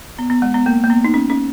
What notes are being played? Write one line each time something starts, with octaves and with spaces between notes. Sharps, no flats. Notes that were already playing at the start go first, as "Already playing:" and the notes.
B3
B3
G#3
B3
A#3
A#3
B3
D#4
C#4
C#4